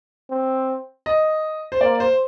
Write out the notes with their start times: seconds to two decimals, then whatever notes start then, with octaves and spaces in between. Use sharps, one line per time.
0.31 C4
1.06 D#5
1.72 C5
1.81 A#3 D5
2.00 C5